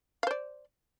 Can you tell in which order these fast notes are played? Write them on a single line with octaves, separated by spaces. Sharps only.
F5 C5 D5